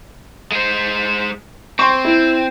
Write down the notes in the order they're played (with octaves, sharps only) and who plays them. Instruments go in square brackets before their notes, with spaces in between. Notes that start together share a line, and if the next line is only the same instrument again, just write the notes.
[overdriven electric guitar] G#3 C5
[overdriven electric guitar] C4 [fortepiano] C6 C#6
[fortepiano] E4